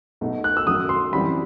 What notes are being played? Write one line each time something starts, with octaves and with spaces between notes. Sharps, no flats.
B1 B2 A3 D#4
F#6
E6
F#2 D#3 F#3 A3 D#6
C6
F#2 E3 G3 C4 B5